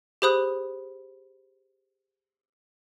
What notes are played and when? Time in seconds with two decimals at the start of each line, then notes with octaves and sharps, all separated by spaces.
0.22 G4 G#4 C5 B5 D#6 F#6